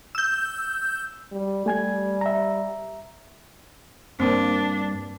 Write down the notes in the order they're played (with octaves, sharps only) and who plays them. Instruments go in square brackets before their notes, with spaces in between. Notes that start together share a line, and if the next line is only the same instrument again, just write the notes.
[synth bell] E6 G6
[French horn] G3
[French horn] G3 [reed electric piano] A3 G#5 G#6
[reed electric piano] E5 A#5
[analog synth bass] G2 [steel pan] A#3 C4 [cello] D4